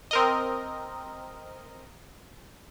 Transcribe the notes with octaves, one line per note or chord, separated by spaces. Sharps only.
C4 A#4 D#5